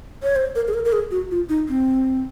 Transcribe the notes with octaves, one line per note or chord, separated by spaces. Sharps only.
C#5
C5
A#4
G#4
A#4
A#4
G#4
F#4
F4
D#4
C4